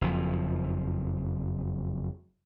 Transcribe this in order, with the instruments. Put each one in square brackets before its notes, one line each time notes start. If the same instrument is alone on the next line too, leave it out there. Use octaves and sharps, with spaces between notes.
[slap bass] F#1 F2 F3